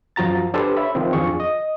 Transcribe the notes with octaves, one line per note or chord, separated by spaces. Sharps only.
F#2 F3 F#4 A#5 A6
D4 G4 A4 B4 C5 D5
C#5 E5 B5
D#3 F3 C4
F2 D4 F4 G#4 C#6
D#5